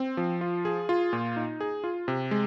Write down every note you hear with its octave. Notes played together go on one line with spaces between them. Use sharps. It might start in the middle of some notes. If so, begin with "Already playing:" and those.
Already playing: C4
F3
F4
G#4
F4
A#2
D#4
G#4
F4
C3
G#3